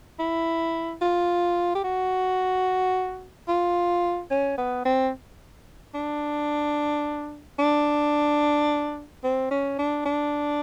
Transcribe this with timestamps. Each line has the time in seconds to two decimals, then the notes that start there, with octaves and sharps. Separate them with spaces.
0.19 E4
1.01 F4
1.75 G4
1.84 F#4
3.48 F4
4.30 C#4
4.58 B3
4.85 C4
5.94 D4
7.59 D4
9.24 C4
9.51 C#4
9.79 D4
10.05 D4